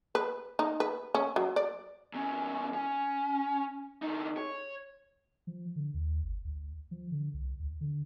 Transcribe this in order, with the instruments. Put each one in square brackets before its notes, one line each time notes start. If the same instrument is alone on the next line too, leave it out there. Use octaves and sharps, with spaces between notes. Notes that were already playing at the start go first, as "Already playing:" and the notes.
[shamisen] B4
D#4
B4
C#4
F#3
D5
[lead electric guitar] E2 C#4
C#4
D3 D#4
C#5
[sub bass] F3
D3
D#2
G1
D2
F3
D3
C2
D2
D3